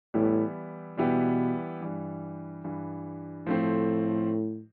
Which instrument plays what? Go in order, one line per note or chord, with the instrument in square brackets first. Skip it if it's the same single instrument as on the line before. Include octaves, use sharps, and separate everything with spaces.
[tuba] A2 [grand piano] E3 G3 B3 E4 G4
[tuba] B2 [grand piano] E3 G3 B3 E4 G4
[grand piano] G2 E3 G3
G2 E3 G3
[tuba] A2 [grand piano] F3 A3 C4